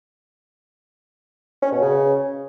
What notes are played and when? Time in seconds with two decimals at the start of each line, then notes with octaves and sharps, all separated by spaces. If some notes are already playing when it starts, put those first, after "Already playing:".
1.62 C#4
1.72 B2
1.82 C#3